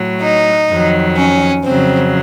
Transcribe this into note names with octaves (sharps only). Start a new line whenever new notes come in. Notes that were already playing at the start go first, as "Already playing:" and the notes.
Already playing: A2 F#3
D#4
F2 D#3 F#3
C#4
F2 C#3 F#3 C4